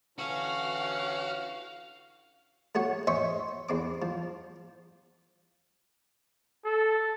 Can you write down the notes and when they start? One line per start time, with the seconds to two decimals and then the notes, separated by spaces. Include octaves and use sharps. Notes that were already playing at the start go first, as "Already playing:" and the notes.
0.18 D3 E3 C#4 F#4 F5
2.75 A3 F#4 C#5 F#5
3.07 C5 C#5 D#5 E5 G#5 C#6
3.69 E2 C4 D6
4.02 F3
6.65 A4